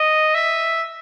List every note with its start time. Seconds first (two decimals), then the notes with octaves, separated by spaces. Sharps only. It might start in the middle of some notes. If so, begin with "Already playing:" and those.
Already playing: D#5
0.35 E5